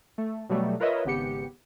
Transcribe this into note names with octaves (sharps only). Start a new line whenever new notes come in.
A3
B2 F#3 G3 A3
F4 A#4 B4 C#5 D#5 E5
G#1 C#3 B3 G4 C#7